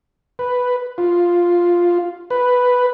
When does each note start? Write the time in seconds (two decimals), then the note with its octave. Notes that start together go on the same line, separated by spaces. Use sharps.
0.39 B4
0.98 F4
2.30 B4